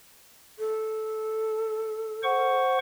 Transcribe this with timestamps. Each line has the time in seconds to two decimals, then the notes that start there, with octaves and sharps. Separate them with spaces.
0.59 A4
2.23 C5 F#5 C#6